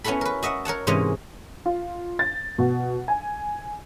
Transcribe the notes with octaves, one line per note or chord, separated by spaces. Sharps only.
B3 C#4 E4 F#4 A4 B5
A#4 B4
F#4 D#5 E5 F#5
A#4 C#5 F#5 A5
G#2 C3 E3 A#3 C#4 D#5
F4
A6
B2
G#5